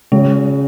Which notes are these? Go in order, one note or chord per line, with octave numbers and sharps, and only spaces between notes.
C#3 G#3